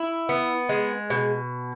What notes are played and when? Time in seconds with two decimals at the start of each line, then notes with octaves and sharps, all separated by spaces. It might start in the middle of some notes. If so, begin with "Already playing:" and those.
Already playing: E4
0.29 B3
0.69 G#3
1.10 B2